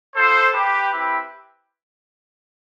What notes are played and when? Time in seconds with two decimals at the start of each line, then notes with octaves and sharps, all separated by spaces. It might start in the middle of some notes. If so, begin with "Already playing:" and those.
0.15 B3 F4 A4 C5
0.53 G4 B4
0.92 C4 E4 G4